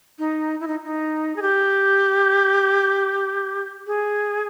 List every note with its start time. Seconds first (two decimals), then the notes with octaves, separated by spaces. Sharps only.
0.19 D#4
0.60 E4
0.68 D#4
0.84 D#4
1.36 G#4
1.42 G4
3.87 G#4